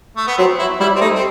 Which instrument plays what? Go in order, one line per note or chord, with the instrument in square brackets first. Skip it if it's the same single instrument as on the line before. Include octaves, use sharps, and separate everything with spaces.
[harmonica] A3
B3
[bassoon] F#3 [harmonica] C4
[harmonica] E4
[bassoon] G3 [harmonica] E4
[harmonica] C4
[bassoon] A3 [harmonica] D#4
[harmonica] C4